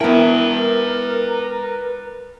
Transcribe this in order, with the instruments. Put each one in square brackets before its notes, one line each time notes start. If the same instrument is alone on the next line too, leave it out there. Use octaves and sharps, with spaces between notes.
[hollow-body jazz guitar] B3 E4 [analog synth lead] A#4 [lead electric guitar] B4 G5